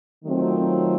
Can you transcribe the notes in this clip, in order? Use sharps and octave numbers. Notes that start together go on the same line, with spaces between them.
D#3 F#3 A3 C4 F4